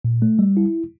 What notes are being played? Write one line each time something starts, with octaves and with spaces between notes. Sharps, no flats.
A#2
A3
G3
E4